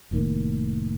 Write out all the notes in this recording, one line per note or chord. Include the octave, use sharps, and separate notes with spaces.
F1 A2 D#3 A#3